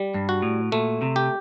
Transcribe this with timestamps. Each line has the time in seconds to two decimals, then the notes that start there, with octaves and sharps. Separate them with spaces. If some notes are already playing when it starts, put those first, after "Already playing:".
Already playing: G3
0.14 G2
0.29 F#4
0.42 A2
0.72 A#2 A3
1.02 C3
1.16 G4